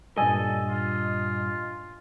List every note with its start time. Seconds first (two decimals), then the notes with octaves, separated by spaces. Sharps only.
0.17 G2 A#2 G3 A4 D#5 G#5
0.69 F4